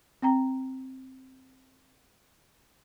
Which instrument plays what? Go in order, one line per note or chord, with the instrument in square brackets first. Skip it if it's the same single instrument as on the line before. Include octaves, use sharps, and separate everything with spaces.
[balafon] C4 G5 A#5